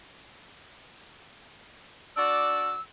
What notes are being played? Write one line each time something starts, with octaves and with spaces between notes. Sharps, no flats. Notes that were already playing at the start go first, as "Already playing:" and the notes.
D4 F#4 D5 E6